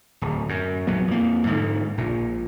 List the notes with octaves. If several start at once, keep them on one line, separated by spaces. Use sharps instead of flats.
D1
F#2
A#1 F#3 B3
F2 A#3
G#2 D3
A#1 A#2